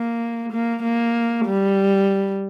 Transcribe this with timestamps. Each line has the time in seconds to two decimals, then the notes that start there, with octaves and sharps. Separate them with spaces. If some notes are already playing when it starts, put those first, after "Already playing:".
Already playing: A#3
0.52 A#3
0.83 A#3
1.46 G3